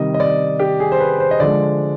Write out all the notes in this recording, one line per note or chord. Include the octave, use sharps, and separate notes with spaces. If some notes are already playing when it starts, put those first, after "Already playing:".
Already playing: C3 D#3 G3 D#5
D#5
D5
G4
G#4
C5
B4
C5
D#5
D3 F3 G#3 D5